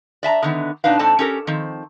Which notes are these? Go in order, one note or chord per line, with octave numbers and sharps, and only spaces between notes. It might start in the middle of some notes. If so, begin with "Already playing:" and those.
D5 E5 A5 A#5
D3 D#3 B3
B2 D4 D#4 B4 F5
G#2 C4 A4 D5 A5
C#4 G4 A4 A#4
D#3 F3 C4